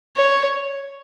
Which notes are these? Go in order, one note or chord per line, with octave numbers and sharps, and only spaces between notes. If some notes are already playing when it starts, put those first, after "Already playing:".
C#5